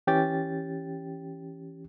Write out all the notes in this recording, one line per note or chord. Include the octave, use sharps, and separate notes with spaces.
E3 C#4 G4 G5 A6